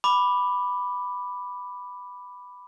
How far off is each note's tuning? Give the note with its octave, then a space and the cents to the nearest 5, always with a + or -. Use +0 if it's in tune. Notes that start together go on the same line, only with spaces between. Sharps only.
B5 +0 D6 +5